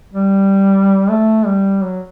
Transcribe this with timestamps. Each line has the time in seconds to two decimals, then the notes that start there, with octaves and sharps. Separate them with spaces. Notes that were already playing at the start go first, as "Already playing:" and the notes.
0.13 G3
1.10 A3
1.46 G3
1.82 F#3